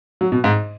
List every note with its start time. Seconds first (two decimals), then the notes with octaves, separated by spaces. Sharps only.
0.21 F#3
0.32 B2
0.44 G#2